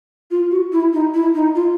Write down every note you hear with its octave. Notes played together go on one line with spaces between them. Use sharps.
F4
F#4
E4
D#4
E4
D#4
F4